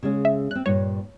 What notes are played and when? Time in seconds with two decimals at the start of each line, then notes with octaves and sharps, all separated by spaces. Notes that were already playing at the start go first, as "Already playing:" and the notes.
0.03 C#3 G#3 C#4
0.25 E5
0.51 C4 C#4 F#6
0.66 G2 A#2 C#5